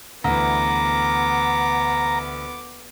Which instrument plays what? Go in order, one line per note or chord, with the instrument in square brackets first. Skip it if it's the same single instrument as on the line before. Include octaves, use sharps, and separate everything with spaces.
[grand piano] D2 E3 [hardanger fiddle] B3 D6 [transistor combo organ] A#5